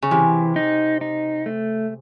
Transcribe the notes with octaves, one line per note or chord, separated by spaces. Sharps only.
C#3
C3 E3
D#4
D#4
A3